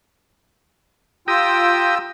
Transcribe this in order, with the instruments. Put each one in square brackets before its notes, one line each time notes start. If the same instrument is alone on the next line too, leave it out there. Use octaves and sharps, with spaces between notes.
[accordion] F4 G5 E6 [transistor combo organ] G4 A#5 D#6